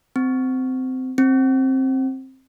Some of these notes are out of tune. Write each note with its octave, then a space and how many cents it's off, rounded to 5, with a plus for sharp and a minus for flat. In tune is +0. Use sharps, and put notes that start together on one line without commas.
C4 -20
C4 +15